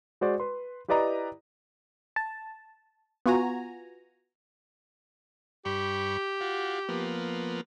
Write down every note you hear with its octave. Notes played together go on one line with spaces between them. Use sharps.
G#3 F#4 C5 D5
B4 C6
E4 G4 B4 D5 D#5 A#5
A5
B3 F4 F#4 G#5 A#5
G2 G4 B5 C#6
F4 F#4
F3 A#3 B3